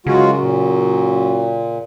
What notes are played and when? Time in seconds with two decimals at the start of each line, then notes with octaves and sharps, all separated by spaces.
0.06 F#2 C#3 G#3 F4 F#4
0.40 A#2